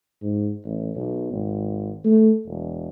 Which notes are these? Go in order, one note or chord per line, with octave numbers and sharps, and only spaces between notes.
G#2
A1
B1
G#1
A3
E1